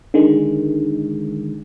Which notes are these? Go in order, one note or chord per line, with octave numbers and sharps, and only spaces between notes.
D3 D#3 G#3